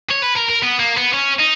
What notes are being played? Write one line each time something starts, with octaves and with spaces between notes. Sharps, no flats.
C#5
B4
A#4
A#4
B3
A#3
B3
C#4
D#4